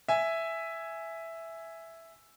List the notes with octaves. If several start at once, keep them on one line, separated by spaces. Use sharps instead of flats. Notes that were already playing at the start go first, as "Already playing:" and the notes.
E5 G#5